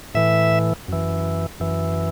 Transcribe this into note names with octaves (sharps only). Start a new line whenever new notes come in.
A2 E3 E5
F#2 E3
F#2 E3